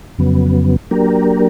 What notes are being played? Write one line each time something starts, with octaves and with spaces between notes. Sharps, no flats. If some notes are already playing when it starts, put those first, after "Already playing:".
F2 C#3 F#3 B3
F#3 A#3 D4 G4 A#4